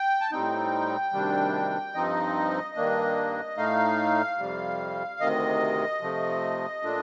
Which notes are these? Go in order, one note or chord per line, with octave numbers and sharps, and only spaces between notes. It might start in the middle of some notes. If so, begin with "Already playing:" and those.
Already playing: G5
A5
A2 G3 C4 D#4 G5
D2 C3 D#3 G3 D4
G2 F3 C4 D#4 D#5
G2 D#3 A#3 D4
A2 A3 D#4 F5
F2 C3 G3
D2 C3 D#3 D#5
C3 F3 A3
A#2 A3 D4